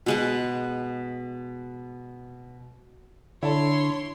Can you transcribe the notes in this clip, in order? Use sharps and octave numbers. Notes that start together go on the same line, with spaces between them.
B2 G#3 F#5
D3 E4 C#5 A5 C6